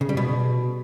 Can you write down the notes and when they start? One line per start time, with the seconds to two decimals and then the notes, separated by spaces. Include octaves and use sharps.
0.01 C#3
0.09 G3
0.17 B2